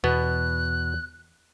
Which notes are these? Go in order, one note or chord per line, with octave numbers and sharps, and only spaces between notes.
E2 B2 B3 F#6